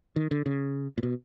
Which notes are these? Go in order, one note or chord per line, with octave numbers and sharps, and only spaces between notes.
D#3
D3
C#3
A#2
B2